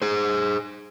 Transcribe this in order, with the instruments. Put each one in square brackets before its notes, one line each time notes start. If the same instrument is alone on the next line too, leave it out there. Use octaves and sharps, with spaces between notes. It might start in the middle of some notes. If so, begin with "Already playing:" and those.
[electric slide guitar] G#4 C5